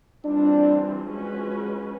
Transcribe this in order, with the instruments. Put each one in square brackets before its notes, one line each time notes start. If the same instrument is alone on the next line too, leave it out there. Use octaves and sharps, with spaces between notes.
[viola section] E3 G3 C4 F4 [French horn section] D4
[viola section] F3 G#3 C#4 F#4 B4